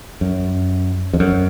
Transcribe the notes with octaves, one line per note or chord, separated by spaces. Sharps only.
F#2
F2
F#2